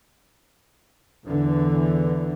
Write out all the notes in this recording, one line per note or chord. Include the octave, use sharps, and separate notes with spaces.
E2 D3 E3